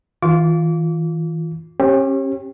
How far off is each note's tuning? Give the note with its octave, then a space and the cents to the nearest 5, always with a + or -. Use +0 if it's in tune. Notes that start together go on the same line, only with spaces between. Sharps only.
E3 -40 F4 +5 D6 -30
C#4 -35 G4 +0